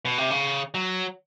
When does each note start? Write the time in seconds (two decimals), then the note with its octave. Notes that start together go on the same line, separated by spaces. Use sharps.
0.05 B2
0.18 C3
0.30 C#3
0.74 F#3